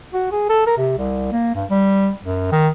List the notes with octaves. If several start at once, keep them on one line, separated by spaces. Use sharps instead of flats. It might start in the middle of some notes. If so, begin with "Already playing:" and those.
F#4
G#4
A4
A#4
C3
C2
A#3
G2
G3
F#2
D#3